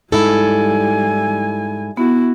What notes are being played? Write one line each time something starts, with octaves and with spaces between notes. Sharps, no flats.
G#2 G3 E4 A4 G#5 E6
B3 E4 F#4